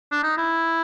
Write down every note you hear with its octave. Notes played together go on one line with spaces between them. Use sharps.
D4
D#4
E4